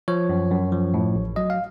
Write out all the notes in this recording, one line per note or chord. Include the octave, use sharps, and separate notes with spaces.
F3 C#5
F#2
F#2
F3
A2
A1
F#3 D#5
F5